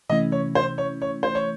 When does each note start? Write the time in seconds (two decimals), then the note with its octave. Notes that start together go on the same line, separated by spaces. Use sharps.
0.09 C3 E3 A3 C#4 E4 D#5
0.32 C#5
0.55 C5
0.78 C#5
1.02 C#5
1.23 C5
1.35 C#5